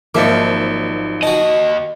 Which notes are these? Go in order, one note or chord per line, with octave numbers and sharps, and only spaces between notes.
G#1 F3 F#3 A#3 D#4 E5 D6
D#2 F#4 D#5 A5